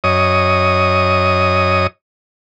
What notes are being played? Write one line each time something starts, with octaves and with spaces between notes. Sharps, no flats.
F#2 C#5 D#5 D#6